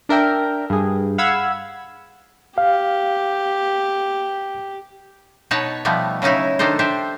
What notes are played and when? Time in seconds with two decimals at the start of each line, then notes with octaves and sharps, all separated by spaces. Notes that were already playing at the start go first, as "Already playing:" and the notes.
0.09 D4 A#4 E5 G5
0.70 G2 G#4
1.18 F5 F#5 B5 E6 G#6
2.58 G4 F5
5.51 B2 D#4 B4 C#5 A5
5.85 B2 F3 G3 A3 B3
6.22 C#3 F#3 C#4 D#4 E4
6.59 D#3 D4 D#4 A4 C5
6.79 D4 G4 C5 E5